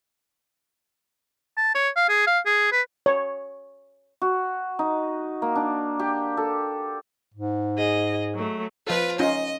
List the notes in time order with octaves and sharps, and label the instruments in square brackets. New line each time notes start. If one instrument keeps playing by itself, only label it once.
[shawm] A5
C#5
F5
G#4
F5
G#4
B4
[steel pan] C#5
[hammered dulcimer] F#4
D#4
A#3
D4
G4
A4
[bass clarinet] G#2
[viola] G#4 D#5
F#3 A3
[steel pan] F3 A4 [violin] F4 B4
[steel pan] C#4 D#4 F4 [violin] D#5